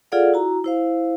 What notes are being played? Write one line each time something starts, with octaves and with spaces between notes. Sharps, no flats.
F4 G#4 A4 D5 F5 F#5
E4 F#4 A#5
E4 C5 F5